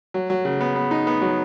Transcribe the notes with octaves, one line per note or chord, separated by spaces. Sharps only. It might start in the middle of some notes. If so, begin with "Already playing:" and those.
F#3
F#3
C#3
B3
B3
D#4
B3
F#3